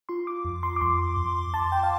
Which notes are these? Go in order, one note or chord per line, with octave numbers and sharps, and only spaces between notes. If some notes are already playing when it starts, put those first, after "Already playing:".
F4 C6
D6
F2
C6
D6
F2 C6
F2
F2 A5
G5
F5